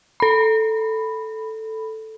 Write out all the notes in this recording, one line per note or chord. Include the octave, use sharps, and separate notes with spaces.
A4 B5